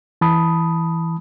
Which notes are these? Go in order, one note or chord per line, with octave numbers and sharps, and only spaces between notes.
E3 A5 B5 D#6